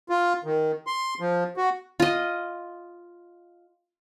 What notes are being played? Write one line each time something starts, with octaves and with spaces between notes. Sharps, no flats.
F4
D#3
C6
F3
F#4
F4 D#5